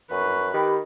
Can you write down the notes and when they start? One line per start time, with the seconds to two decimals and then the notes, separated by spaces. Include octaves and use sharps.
0.11 F#2 B4 C#6
0.54 D#3 G4 B5